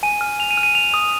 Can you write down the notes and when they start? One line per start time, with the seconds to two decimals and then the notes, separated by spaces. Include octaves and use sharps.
0.03 G#5 D#7
0.21 F6
0.39 G#5 F7
0.51 D#7
0.57 F6
0.63 D#7
0.75 G#5 F7
0.94 D#6